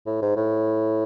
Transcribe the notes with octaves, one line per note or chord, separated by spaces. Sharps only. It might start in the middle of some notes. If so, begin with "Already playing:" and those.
A2
G#2
A2